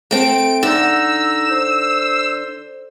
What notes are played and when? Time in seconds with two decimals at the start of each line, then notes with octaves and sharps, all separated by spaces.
0.11 A3 C4 A4 D7
0.63 D3 D#4 E6
1.51 C5